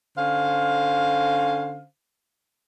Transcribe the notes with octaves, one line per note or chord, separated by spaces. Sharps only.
D3 C#4 C5 F5